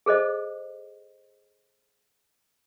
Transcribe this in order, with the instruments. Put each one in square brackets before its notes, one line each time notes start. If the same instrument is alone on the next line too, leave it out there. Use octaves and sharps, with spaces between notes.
[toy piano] G#4 A4 C5 D#5